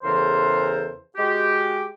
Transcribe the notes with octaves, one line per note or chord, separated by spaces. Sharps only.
E2 C#3 E3 A4 A#4 C5
G#3 F#4 G4